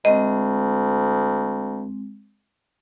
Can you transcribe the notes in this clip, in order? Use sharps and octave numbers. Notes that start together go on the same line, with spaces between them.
D2 G#3 C4 D#5